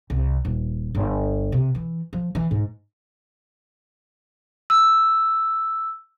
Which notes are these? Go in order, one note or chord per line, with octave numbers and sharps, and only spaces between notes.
C2
D#1
G1
C3
E3
F3
E3
G#2
E6